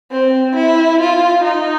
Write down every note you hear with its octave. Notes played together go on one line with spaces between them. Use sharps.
C4
E4
F4
D#4